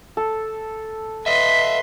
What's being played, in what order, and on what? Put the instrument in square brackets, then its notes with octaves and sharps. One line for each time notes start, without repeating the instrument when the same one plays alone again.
[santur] A4
[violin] B4 C6 [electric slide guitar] D#5 E5 [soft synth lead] B6